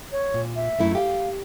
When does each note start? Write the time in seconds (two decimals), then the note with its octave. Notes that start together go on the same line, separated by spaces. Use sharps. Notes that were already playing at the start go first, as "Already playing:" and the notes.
0.12 C#5
0.34 A#2
0.56 E5
0.79 F#2 A3 E4
0.95 G4 F5